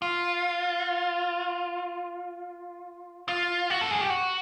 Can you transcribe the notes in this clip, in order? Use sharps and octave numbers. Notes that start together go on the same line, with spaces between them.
F4
F4
F#4
A4
G#4
G4
F#4